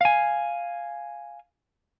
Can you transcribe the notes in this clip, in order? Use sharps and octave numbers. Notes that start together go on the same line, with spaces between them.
F5 G#5